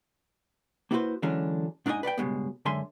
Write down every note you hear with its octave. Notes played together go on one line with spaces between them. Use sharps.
A#3 B3 E4 F#4 B4 C5
D3 E3 F#3 G#3 C#4 D4
G#2 D4 D#4 D5 D#5 G#5
B4 D5 F5 G5
C#2 G2 B2 G#3 B3
F#2 D3 G#3 E5 G#5 C6